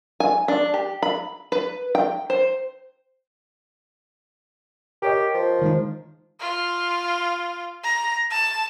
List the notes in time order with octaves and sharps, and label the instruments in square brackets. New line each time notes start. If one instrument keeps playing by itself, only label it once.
[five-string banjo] G#5
D4
G4
B5
B4
G5
C5
[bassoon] G4 [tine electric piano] A#4 C#5 D#5
[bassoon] F3
[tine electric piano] D#3 G#3 D#4
[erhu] F4
A#5
A5